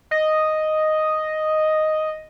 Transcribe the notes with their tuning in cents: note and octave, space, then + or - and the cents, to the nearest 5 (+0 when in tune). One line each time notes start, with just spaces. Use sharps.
D#5 +0